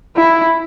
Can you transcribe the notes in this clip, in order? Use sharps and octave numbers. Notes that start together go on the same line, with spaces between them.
E4